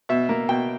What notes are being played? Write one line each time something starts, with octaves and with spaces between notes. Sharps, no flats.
B2 E5
A#3
B2 G5